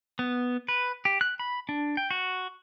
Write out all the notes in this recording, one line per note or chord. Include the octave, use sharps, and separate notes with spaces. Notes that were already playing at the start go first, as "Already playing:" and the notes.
B3
B4
G4
F#6
B5
D4
G5
F#4